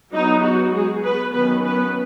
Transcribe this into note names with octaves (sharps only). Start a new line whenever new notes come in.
F#3 B3 D#4
F#4
G#3 G#4
B3 B4
D#3 F#3 B3 C#4 B4
B3 B4